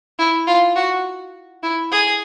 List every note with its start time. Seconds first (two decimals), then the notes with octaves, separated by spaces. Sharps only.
0.19 E4
0.47 F4
0.76 F#4
1.63 E4
1.92 G#4